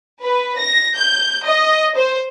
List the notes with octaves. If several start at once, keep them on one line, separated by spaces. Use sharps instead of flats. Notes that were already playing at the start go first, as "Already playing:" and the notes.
B4
A#6
G6
D#5
C5